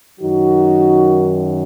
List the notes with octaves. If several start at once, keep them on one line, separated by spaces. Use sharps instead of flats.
F#2 D#3 F#3 D#4 F#4